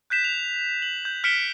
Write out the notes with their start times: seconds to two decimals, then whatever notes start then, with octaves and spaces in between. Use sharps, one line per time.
0.10 F#6 G6 B6 E7
0.24 F7
0.82 F#7
1.05 G6
1.24 F6 B6 C#7 D7 E7 G7